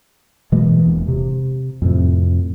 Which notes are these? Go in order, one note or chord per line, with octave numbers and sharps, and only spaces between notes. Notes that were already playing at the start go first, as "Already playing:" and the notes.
B2 E3 G#3 A#3
E1
C3
F2 A2 C3